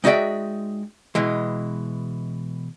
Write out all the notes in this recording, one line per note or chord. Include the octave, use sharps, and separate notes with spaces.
G#3 D#4 F#4 D5 E5 G5
B2 E3 G#3